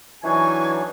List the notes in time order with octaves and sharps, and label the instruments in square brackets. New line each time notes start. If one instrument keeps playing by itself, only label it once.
[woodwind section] E3 [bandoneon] F#3 D4 D#4 [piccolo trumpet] G#5 [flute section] C#6 G#6